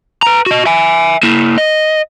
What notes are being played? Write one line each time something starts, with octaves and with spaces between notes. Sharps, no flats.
B4 A#5
F#4 D#5
E5 G#5
A#3 E4
D#5